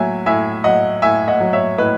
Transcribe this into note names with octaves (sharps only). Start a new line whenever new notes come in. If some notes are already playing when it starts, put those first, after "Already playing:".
Already playing: A2 F#3 E5 G#5
A2 E5 G#5
F#3 D#5 F#5
A2 E5 G#5
D#5 F#5
F#3
C#5 E5
A2 B4 D#5